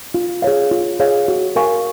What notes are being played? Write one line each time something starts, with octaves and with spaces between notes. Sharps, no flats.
F4
G#4 C#5 F5
F4
G#4 C#5 F5
F#4
A#4 F5 G#5 C#6